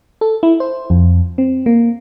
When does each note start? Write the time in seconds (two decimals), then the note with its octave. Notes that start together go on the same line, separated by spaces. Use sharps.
0.21 A4
0.43 E4
0.60 C5
0.90 F2
1.38 C4
1.66 A#3